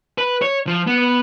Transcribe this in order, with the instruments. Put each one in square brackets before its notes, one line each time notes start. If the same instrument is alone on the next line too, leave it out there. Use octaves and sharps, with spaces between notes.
[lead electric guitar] B4
C#5
F3
B3